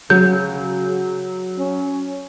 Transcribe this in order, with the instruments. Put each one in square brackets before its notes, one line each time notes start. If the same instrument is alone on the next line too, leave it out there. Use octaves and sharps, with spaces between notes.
[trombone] C#3 [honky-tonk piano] F#3 [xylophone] G6
[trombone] C#4